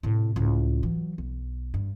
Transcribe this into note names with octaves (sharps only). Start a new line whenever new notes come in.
A2 C3
C#2 A2
E3 F#3
B1
G2